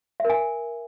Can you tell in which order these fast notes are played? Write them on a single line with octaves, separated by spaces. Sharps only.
E5 A#4 G#5